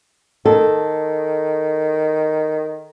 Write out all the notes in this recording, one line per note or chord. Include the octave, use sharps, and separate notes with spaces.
D#3 A4